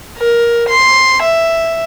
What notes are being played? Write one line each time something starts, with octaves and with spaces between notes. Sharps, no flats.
A#4
C6
E5